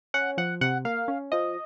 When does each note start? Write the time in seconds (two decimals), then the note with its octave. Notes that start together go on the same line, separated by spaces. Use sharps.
0.14 C#4 F#5
0.37 F3 F#5
0.61 C3 F#5
0.85 A#3 F5
1.08 C#4
1.32 F3 D#5